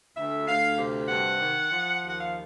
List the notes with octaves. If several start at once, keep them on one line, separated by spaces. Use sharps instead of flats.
D2 E5
D2 F5
C3
G2 F#5
D#3
F3
D#2
F#5
F5